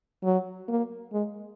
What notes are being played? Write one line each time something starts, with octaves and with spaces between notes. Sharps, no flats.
F#3
A#3
G#3